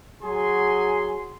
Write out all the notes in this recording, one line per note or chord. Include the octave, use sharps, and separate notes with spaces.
F#3 G#4 G#5 C6